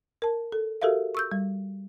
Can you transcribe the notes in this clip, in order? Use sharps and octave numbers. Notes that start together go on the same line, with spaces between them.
A#4 A5
A4
F#4 G4 A4 A#4 E5 F5
C#6 E6 G6
G3